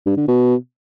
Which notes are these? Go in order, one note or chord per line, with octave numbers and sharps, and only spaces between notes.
G2
D3
B2